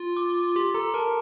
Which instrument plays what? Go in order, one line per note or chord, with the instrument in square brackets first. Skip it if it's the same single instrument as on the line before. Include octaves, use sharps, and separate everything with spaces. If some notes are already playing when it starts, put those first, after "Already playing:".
Already playing: [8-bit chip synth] F4
[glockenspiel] D6
[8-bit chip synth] G4 [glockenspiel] C6
[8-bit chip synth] A4 [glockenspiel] A#5
[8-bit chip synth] A#4 [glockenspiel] A5